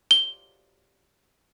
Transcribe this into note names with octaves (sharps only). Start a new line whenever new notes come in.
G7